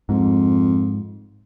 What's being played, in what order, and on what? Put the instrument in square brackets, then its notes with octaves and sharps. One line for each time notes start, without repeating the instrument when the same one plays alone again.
[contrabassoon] F2 [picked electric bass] G#2